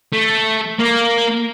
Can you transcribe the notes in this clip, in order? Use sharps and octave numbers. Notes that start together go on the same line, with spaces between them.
A3
A#3